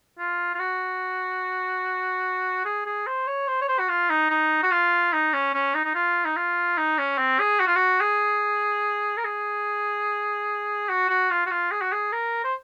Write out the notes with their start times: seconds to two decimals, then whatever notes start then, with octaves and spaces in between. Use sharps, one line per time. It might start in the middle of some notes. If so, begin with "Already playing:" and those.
0.19 F4
0.55 F4
0.60 F#4
2.65 G#4
2.86 G#4
3.07 C5
3.27 C#5
3.48 C5
3.61 C#5
3.68 C5
3.79 F#4
3.89 F4
4.10 D#4
4.30 D#4
4.63 F#4
4.71 F4
5.13 D#4
5.34 C#4
5.54 C#4
5.75 D#4
5.85 D#4
5.95 F4
6.25 D#4
6.37 F4
6.78 D#4
6.99 C#4
7.18 C4
7.40 G#4
7.60 F#4
7.67 F4
7.76 F#4
8.01 G#4
9.17 A#4
9.24 G#4
10.89 F#4
11.09 F#4
11.31 F4
11.46 F#4
11.51 F4
11.71 G#4
11.81 F#4
11.92 G#4
12.13 A#4
12.44 C5